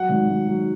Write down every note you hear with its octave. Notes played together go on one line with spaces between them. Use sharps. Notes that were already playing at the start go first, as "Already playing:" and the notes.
Already playing: F#3 F#5
G#1
G#1
F#3